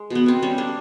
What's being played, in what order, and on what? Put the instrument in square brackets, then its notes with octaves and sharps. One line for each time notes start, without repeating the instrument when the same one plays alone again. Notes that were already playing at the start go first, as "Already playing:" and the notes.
Already playing: [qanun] G#3
B2 B3
B2 C4
G3 C#4
A#3 D4